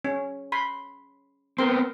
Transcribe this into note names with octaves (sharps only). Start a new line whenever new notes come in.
C#4
B5 C6
B3 C4 A#4 C6